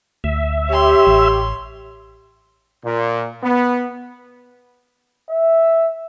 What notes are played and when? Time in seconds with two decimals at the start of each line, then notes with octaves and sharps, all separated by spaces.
0.24 D2 E5
0.69 G4 C#5 C6
1.07 A1
2.85 A#2
3.43 B3
5.30 E5